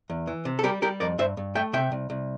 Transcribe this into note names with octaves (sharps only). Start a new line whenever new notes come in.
E2
E3
C3
A4
G3 G4 A#4
G3 G4 A#4
F2 A#4 D5
G2 C5 E5
G2
A3 E5 G5
C3 E5 G5
C2
C2